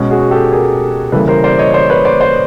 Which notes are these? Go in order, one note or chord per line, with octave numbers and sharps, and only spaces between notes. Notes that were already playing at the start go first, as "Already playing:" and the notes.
Already playing: B2 G#3 C#4
F#4 G#4
G4 A4
G#4 A#4
C#3 E3 G3 A#3 A4 B4
A#4 C5
C5 D5
C#5 D#5
C5 D5
B4 C#5
C5 D5
C5 D5